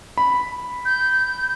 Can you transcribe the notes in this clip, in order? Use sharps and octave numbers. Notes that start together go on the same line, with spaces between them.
B5
G6